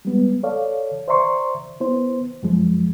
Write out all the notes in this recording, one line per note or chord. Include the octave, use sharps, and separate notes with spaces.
G3 G#3 B3
A4 C#5 D5 F5
C5 D5 E5 A#5 C6 C#6
B3 E4 C5
F#2 F3 G#3